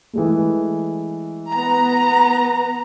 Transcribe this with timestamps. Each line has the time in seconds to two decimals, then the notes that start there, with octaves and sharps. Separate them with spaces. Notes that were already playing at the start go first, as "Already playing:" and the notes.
0.13 E3 G#3 A3
1.50 B3 A#5